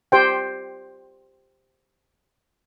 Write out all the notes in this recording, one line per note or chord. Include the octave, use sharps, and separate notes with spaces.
G4 C5 G5